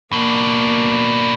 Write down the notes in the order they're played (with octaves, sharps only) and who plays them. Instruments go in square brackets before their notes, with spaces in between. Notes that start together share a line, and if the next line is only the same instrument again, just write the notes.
[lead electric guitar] B2 D4 [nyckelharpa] A#3 D5